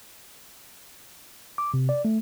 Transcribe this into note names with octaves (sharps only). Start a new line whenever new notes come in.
D6
C3
D5
A3